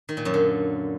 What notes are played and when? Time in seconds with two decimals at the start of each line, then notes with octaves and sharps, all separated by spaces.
0.09 D#3
0.17 A#2
0.25 F#2
0.34 D3